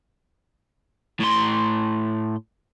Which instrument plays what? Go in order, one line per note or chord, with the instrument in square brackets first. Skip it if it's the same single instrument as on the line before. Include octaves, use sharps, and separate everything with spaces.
[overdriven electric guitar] A2 C6